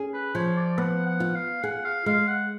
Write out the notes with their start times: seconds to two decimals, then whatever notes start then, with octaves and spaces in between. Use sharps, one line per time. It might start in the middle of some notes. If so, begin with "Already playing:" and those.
Already playing: C#4 G#4
0.13 B4
0.35 F3 C#5
0.56 D5
0.78 B3 F#5
1.06 F#5
1.20 F4
1.35 F5
1.63 G#4 F#5
1.85 F5
2.06 G#3 F5
2.27 F#5